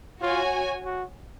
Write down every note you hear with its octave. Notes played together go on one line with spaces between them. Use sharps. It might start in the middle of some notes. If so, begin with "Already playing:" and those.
F4 F#4 C#5 G#5
F#4